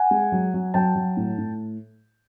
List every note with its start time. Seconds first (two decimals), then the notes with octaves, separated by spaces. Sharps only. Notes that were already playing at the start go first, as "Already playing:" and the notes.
Already playing: F#5 G#5
0.11 G#3
0.32 F#3
0.54 F#3
0.74 F#3 G5 A5
0.96 F#3
1.17 A2
1.38 A2